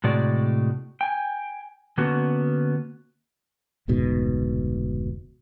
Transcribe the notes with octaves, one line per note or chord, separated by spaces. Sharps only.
A2 C3 G#3 F#4 D5
G5 G#5
D3 A#3 B3 C#4 F#4
F1 D2 G#2 B2